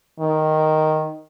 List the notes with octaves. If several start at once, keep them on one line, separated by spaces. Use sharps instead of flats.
D#3